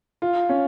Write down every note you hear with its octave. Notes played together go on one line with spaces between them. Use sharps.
F4
C#4